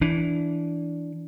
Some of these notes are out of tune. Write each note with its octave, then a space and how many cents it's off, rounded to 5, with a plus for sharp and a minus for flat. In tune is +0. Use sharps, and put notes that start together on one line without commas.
E3 +0 D4 -15